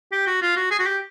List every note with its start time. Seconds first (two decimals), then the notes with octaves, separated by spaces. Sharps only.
0.12 G4
0.27 F#4
0.42 F4
0.56 F#4
0.71 G#4
0.79 F#4
0.86 G4